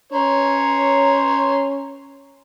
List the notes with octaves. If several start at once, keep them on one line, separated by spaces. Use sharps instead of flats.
C#4 C#5 A#5 C6